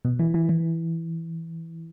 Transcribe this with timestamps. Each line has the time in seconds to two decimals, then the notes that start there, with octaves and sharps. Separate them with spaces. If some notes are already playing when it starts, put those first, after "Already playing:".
0.05 B2
0.19 E3
0.34 E3
0.49 E3